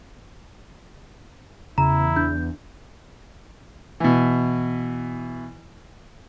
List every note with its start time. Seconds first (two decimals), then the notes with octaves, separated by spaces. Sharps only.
1.78 E2 C#3 E4 A#5
2.16 D4 G6
4.00 B2 E3